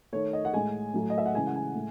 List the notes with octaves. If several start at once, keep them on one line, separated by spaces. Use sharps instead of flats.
D#3 A3 C#5
D#5
F#5
A2 G#3 G#5
A2 F#3 A3
D#5
E5
F#5
C#3 E3 G#3 G#5
F#5
G#5
A2 G#3